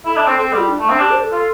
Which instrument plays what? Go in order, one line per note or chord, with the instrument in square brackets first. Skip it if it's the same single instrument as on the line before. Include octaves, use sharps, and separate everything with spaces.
[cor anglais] E4 [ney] A4
[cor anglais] D4
C4
[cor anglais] C4 [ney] A4
[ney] A4
[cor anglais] G3 [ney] F4
[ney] D4
[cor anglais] A3
C4
[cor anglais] D4 [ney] G4
[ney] C5
A4
[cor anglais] F4